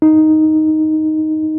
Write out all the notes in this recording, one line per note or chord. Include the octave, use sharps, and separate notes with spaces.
D#4